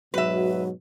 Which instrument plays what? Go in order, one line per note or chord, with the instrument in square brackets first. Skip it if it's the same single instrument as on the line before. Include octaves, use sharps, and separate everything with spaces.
[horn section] G#2 B2 F#3 [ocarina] F#4 [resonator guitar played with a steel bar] B4 E5